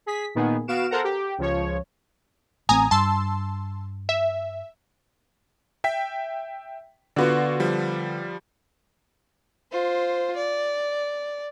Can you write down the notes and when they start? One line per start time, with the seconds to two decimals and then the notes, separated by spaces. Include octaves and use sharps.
0.06 G#4 B6
0.35 A#2 D#3 B3 G#4
0.68 B3 F#4 F5 D7 E7
0.90 A4 A#4 C5 F#5 A#5
1.04 G4
1.38 C#2 F3 C#5
2.69 A1 A3 C4 G#5 A#5 D#6
2.91 G2 A5 C6 E6
4.09 E5
5.84 E5 G5 B6
7.16 D3 B3 F4 F#4 D5
7.60 F3 G3
9.71 F4 C5
10.36 D5